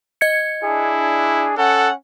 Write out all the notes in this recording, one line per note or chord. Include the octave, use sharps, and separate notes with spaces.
D#5 G#6 C#7
D4 E4 G#4
C#4 A4 F#5